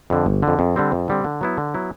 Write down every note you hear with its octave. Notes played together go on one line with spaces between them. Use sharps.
F2 D3
G1
D3
F2
F2
D3 G3 C4
F2
D3 G3 C4
D3
F#3 B3 E4
D3
F#3 B3 E4